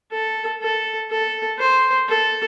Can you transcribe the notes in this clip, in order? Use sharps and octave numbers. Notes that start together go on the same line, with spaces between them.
A4
A4
A4
C5
A4